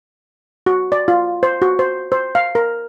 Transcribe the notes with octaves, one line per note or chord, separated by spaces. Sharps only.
F#4
D5
F4
C5
F#4
C5
C5
F5
A#4